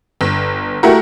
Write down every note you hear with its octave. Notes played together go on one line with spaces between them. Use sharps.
G1
A3 E4 F#4 G4 A#4